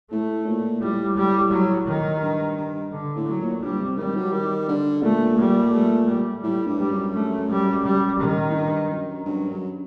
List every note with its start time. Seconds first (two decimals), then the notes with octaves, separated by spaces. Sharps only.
0.11 A2 A3
0.46 A#2
0.81 A2 G3
1.17 G3
1.51 F#3
1.87 D#3
2.22 G2
2.57 G2
2.92 D3
3.16 A2
3.27 F#3
3.40 A#2
3.62 G2 G3
3.80 C3
3.98 D#3 G3
4.16 F#3
4.32 D#3
4.68 D3
5.02 A#2 A3
5.38 G3
5.73 A3
6.09 G3
6.43 A2 G3
6.67 G2
6.79 G3
6.90 F#2
7.14 A3
7.49 G3
7.84 G3
8.20 D#3
8.48 A2
8.55 G2
8.90 F#2
9.25 G2 F#3
9.49 F#2